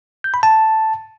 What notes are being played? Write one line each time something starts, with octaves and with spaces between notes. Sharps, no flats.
G6
B5
A5